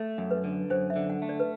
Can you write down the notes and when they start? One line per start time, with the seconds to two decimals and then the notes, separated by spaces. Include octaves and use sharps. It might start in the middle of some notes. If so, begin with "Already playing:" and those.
Already playing: A3 A4
0.18 F#2
0.31 B4
0.44 D3
0.70 F#2 C5
0.90 E5
0.96 D3
1.10 F#5
1.22 A3
1.29 D5
1.40 B4